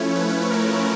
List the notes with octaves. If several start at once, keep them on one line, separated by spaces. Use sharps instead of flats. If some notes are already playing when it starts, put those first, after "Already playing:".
Already playing: F3 A3 C#4 E4 C#5
B4
A#4